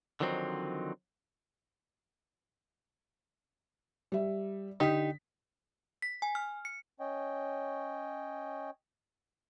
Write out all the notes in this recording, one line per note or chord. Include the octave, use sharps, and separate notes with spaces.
D3 D#3 F3 F#3 C4 D#4
G3 E5
D3 D#4 G4 B6
B6
G#5
F6
C#7
C#4 C#5 D#5 G5